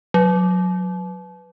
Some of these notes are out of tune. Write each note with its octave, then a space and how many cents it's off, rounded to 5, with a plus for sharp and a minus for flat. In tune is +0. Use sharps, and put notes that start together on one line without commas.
F#3 -20